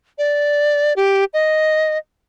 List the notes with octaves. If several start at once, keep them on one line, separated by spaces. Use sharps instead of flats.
D5
G4
D#5